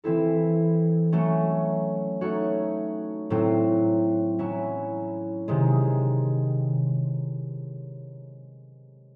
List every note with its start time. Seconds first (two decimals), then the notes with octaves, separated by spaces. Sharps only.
0.04 E3 C4 E4 A4
1.12 F#3 A3 C#4
2.21 A3 D#4 F#4 C#5
3.30 A2 F#3 C4
4.39 F#3 C#4 E4
5.48 C3 D#3 G#3